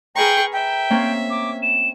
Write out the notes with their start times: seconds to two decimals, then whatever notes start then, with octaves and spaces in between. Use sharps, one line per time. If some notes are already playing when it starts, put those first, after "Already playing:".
0.15 G#4 A#4 B4 G5 A#5 C#6
0.53 E5 G5
0.90 A#3 C4 C#4
1.30 D6
1.63 E7